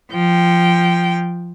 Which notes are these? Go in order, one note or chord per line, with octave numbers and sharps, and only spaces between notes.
F3 G5